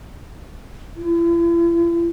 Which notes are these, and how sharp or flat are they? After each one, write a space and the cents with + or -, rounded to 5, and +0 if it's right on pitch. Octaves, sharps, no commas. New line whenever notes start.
E4 +45